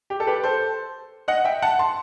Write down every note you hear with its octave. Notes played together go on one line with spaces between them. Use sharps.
G4
A4
G4 B4
A4 C5
D#5 F#5
E5 G5
F#5 A5
A5 C6